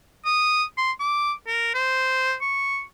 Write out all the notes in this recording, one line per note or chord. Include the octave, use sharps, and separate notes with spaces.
D#6
C6
D6
A#4
C5
C#6